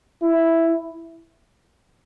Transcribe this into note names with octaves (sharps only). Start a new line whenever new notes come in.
E4